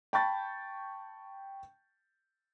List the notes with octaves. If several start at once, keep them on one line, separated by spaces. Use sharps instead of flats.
G5 A5 B5 C#6 G6 A6